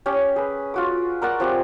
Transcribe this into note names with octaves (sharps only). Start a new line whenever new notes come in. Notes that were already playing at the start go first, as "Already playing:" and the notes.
C#4 G4
G#4 B4
F4 F#4 D6
A#4 D5 F#5 C#6
F3 C4 G4